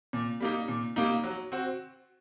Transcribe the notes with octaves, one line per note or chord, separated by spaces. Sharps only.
A#2
G3 A#3 D#4
A#2
G3 A#3 D#4
F#3
C4 F#4